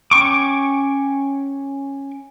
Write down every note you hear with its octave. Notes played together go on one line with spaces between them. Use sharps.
C#4 G5 C#6 D6